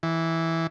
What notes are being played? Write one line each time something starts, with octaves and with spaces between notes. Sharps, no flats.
E3